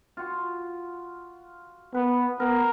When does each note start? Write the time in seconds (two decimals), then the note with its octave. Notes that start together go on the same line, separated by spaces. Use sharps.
0.17 F4 F#4
1.94 B3 B4
2.40 B3 A#4